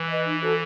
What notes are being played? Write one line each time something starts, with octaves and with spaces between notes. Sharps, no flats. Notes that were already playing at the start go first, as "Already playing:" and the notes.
Already playing: E3
B4 D#5
D#4
F#4 A4 C5